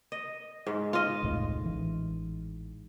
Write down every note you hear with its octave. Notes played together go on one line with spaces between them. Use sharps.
D#5
G#2
F4 D#5
E1 C2 A2
A1 E3